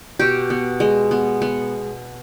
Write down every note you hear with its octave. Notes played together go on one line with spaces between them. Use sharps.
B2 G4
B3
G#3
B3
B3